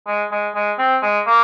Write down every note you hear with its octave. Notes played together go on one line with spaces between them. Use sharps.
G#3
G#3
G#3
C4
G#3
A#3